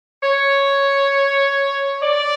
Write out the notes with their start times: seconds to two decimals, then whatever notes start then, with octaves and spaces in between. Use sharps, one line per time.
0.23 C#5
2.03 D5